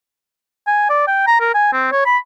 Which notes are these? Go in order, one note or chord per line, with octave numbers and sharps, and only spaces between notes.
G#5
D5
G5
A#5
A#4
G#5
C4
C#5
B5